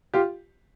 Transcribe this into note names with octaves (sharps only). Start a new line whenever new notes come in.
F4 G4